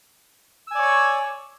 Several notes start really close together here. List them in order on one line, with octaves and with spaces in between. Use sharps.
E6 G#5 D5 C#5 C#6